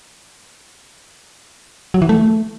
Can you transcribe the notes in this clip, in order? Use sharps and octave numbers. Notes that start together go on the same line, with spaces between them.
F#3
E3
A3